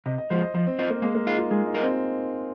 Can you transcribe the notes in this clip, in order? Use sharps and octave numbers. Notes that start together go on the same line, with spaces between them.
C3 D#5
D#5
F3 G#3 F4 C5
D#5
F3 D#5
C4
C4 F4 C5 D#5
A#3
G#3 A#3
A#3
D#4 F4 G#4 F5
F4
G#3 G#4
D#4
F4 A#4 D#5
C4